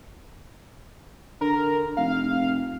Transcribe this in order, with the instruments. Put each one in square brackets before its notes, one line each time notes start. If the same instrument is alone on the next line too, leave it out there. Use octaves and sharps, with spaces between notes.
[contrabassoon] D3 [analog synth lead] A#4
[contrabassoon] F1 [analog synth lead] F5